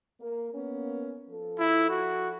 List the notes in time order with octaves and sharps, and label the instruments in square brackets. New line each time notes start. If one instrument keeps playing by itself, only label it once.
[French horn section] A#3 A#4
A#3 B3 C#4
F3 A4
[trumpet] E4
F#4